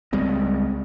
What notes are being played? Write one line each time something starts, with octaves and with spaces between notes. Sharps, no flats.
C#2 G3 G#3 C4